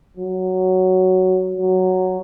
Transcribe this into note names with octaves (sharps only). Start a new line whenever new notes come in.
F#3
F#3